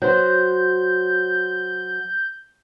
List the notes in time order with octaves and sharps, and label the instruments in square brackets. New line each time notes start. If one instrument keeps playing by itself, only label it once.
[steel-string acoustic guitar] F#3 C5 [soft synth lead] G6